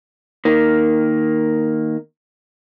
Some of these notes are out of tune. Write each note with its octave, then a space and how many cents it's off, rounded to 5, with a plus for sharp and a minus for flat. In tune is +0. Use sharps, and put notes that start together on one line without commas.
D#3 +0 A#3 +0